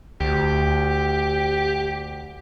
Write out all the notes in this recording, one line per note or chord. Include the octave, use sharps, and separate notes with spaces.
D2 G4